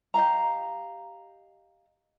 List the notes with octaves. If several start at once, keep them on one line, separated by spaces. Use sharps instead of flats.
G4 D#5 F5 A#5